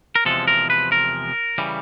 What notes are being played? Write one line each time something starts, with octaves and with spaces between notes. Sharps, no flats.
A#4
E2 C3 F3 G#3 A4
A#4
B4
A#4
C#3 E3 G3